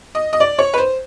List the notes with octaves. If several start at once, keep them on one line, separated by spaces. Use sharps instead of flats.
D#5
D#5
D5
C#5
B4
C5